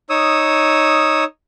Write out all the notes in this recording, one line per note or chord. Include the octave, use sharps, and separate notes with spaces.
D#4 C#5 D#6 E6